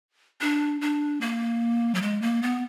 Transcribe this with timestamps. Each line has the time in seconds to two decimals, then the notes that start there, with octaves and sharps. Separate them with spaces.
0.41 D4
0.81 D4
1.21 A#3
1.95 F#3
2.02 G#3
2.22 A#3
2.42 B3